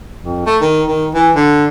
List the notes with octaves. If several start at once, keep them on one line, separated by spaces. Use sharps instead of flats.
F2
A3
D#3
D#3
E3
D3